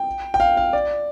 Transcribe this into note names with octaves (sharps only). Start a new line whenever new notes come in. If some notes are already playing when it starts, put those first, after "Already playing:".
Already playing: G5
G5
F5
F5
D5